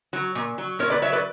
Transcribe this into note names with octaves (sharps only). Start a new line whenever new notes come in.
F#3
A#2
F#3
A#2 A#4 C#5
B4 D5
F#3 C#5 E5
B4 D5